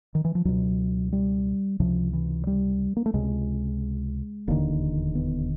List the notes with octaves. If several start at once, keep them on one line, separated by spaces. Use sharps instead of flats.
D#3
E3
F3
C#2 B2 F#3
G3
C#2 C3 F3
E3
G3
A#3
A3
C#2 C3 G#3
E1 D#2 D3 A#3
B3